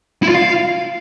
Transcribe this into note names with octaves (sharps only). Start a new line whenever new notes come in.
E4
F4
F5